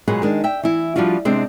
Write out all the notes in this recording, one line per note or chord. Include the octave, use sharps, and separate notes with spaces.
A#2 F#3 G#3 G#4 B4 F#5
D#3 G#3 D4
E5 G5
E3 E4
F3 G3 D4 F4 F#4
C3 G#3 C4 D4